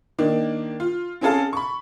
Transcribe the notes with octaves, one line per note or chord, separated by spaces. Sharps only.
D#3 A#3 D4
F4
C4 C#4 G#4 A4 F5 A5
B5 C#6